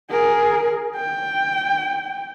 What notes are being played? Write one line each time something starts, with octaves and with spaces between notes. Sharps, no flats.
G#4 A#4
G5